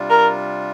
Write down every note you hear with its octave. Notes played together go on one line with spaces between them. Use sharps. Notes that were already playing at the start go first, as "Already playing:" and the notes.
Already playing: C3 G3 D4 F4
A#4